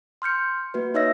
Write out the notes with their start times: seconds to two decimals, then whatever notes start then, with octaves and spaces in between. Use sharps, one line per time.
0.22 C6 F6 G6 C#7
0.74 A#3 F#4 B4
0.94 D#4 C#5 D#5 E5 E6 A#6